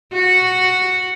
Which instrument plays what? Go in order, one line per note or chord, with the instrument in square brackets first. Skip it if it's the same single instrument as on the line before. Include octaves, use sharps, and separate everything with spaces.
[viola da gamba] F#4